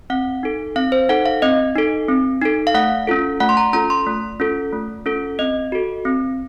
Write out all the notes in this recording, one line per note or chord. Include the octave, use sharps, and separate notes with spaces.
C4 F#5
D#4 A4
C4 F5
C5
D#4 A4 F#5
F5
C4 D#5
D#4 A4
C4
D#4 A4
F5
A3 F#5
C#4 F4 A4
A3 F#5
C6
A#5
C#4 F4 A4 A#5
C6
A3
C#4 F4 A4
A3
C#4 F4 A4
C4 D#5
F#4 A4
C4